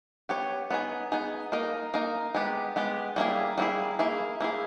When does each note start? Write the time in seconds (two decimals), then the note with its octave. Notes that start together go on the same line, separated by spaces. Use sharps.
0.29 B3 G4 C#5
0.70 B3 D#4 G#4
1.12 B3 D#4 G#4
1.52 A#3 D#4 A#4 D#5
1.94 A#3 D#4 A#4 D#5
2.34 G#3 B3 G4
2.76 G#3 B3 G4
3.16 G3 A#3 C#4 E4 G#4
3.58 G3 A#3 C#4 E4 G#4
3.99 A#3 E4 G#4
4.40 A#3 E4 G#4